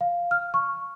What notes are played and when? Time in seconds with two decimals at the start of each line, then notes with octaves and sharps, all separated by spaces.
0.01 F5
0.31 F6
0.54 C#6